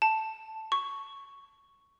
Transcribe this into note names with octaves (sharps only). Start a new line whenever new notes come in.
A5
C#6